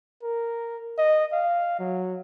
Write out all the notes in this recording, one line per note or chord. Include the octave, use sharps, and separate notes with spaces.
A#4
D#5
F5
F#3